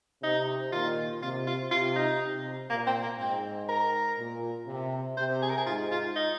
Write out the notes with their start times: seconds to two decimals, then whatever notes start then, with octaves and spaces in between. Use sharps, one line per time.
0.23 C3 D#4
0.72 A#2 D#3 F4
1.22 C3 F4
1.47 F4
1.71 C3 F4
1.96 D#4
2.21 C3
2.70 A#2 A#3
2.87 C4
3.03 A#3
3.19 G#2 C4
3.69 A#4
4.18 A#2
4.67 C3
5.17 C3 C5
5.42 G#4
5.50 A#4
5.58 G#4
5.66 G#2 F4
5.91 F4
6.16 D#4